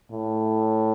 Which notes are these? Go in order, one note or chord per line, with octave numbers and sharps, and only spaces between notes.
A2